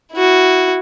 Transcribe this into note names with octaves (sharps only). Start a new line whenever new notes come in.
E4 F#4